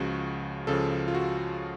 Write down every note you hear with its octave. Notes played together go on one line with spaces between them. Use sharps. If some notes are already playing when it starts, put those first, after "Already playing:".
Already playing: C#2 C#3 F3 F#4
C#2 C#3 F3 A4
F4
F#4